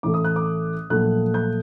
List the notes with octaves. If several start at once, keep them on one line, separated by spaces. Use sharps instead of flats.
A1 A2 A3 D6
D#6
F#6
D6
A#1 A#2 F#3 A3 F#6
G6